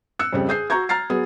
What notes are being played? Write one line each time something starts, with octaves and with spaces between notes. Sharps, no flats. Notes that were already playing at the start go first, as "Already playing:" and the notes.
E6 F#6 C#7
F2 C#3 G3
G#4 G6 C7
F#4 A#5 C#6 G6 G#6
A#5 F6 A6 C7
F#3 B3 G#4